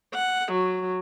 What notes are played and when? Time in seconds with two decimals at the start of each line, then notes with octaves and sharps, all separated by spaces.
0.14 F#5
0.52 F#3